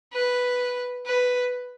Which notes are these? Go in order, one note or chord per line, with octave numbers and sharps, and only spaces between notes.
B4
B4